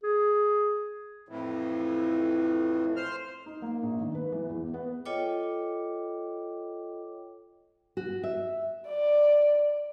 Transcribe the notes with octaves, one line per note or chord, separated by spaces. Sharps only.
G#4
F2 A2 E3
C5 F6
D#4
A#3
A#1
D#3
B4
E3
E2
B3
F4 A4 C#5 D#5 G5 D6
F#4
E5
D5